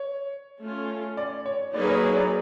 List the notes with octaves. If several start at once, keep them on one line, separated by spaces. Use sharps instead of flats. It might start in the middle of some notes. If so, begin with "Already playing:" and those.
Already playing: C#5
A3 C#4 F4
D5
C#5
F#3 A#3 D#4 G#4 B4 D5
C#5
C#5
D5